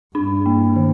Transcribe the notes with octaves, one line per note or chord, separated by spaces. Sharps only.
G2 D4
A#3
D#3